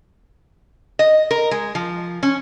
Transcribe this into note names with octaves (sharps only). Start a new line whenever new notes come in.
D#5
A#4
G#3
F3
C#4